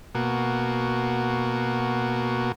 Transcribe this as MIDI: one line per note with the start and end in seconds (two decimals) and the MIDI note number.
0.15 2.52 47
0.15 2.52 58
0.15 2.52 66